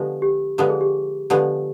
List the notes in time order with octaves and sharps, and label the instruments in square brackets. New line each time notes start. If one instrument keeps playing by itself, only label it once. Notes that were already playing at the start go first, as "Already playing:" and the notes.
Already playing: [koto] D3 F3 G#3 B3 [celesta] G4
[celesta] G4
[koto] D3 F3 G#3 B3 [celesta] G4
[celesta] G#4
G4
[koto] D3 F3 G#3 B3 [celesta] G4